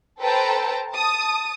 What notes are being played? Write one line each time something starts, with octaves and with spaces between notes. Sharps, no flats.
A4 B4 C5 G5 A5 A#5
A5 D#6